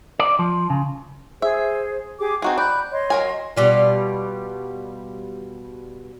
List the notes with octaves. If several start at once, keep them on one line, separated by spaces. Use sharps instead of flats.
D5
F3
C#3
G#4 C5 E5
G4 G#4 D6
C4 D#4 F#4 G#4
D5 B5 F#6 G6
C#5 D#5 C6
F#3 A#4 G#5
B2 G3 F4